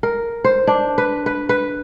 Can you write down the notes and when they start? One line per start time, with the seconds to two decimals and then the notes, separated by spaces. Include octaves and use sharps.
0.03 A#4
0.44 C5
0.67 D4
0.98 B4
1.26 B4
1.49 B4